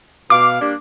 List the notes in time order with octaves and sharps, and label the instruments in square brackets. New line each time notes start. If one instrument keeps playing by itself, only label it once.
[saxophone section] B2 F5 [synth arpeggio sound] D6
[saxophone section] G3 A#3 D4